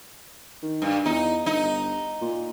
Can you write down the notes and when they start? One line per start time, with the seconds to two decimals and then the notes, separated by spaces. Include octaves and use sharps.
0.63 D#3
0.82 G2
1.05 E2 D#4
1.46 G1 D#4
2.22 A#2